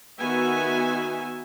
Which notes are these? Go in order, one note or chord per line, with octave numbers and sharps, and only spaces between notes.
D#3 B3 F#4 E5 G#5